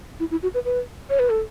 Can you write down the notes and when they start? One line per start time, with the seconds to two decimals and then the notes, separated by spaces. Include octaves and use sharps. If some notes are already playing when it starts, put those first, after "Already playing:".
0.20 E4
0.31 E4
0.43 F#4
0.54 B4
0.65 B4
1.10 C#5
1.19 B4
1.30 A4